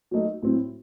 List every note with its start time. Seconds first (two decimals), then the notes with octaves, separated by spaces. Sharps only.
0.11 F#3 A3 D#4
0.43 A2 F#3 C4 E4